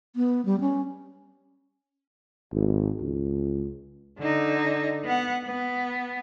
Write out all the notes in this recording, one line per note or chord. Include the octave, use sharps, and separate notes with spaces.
B3
G3
C#4
G#1
C#2
D3 D#4
B3 F#5
B3